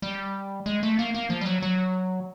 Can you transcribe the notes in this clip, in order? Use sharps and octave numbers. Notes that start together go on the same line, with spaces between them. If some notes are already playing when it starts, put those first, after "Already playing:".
G3
G#3
A3
A#3
A#3
F3
G3
F#3
F#3